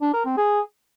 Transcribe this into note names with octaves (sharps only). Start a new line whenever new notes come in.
D4
A#4
C4
G#4